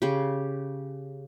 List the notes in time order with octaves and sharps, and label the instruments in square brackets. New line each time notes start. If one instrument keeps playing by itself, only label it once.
[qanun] C#3 G4